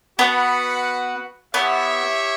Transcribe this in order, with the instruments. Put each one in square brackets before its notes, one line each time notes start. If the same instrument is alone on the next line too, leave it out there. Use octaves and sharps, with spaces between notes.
[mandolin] B3 [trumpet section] F#4 B4 F#5
[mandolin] B3 [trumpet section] E4 G4 C#5 E5